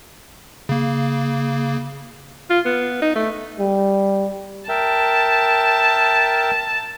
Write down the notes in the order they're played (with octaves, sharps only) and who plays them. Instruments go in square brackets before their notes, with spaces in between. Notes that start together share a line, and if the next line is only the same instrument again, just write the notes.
[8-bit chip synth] C#3 A#3
[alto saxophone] F4
B3
D#4
A3
[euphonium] G3
[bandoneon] A#4 E5 G5 [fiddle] A5